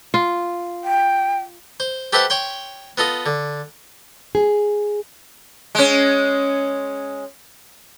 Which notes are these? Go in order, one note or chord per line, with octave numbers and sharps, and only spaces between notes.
F4
G5
C5
G4 A4 B4 C5 E5 F#5
C#5 G5 C6
B3 F4 A4 D#5
D3
G#4
G#3 C#4